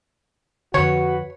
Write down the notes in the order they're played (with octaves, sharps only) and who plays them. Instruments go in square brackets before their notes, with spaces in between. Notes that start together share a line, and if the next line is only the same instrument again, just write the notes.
[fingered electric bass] F2 D3 [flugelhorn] F#4 [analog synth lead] B4 [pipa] C#5